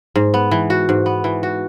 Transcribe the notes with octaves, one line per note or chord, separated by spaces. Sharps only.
G#2
B3
E3
F#4
G#2
B3
E3
F#4